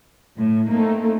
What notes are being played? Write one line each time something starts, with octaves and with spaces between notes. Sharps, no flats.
A2
A3 A#3 C4 D#4